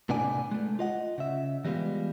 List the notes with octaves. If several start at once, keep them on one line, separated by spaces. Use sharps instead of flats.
A2 C3 B3 D4 D5 G#5
G#3 A3
F4 D#5 F#5
C#3 E5
E3 G3 G#3 B3 F4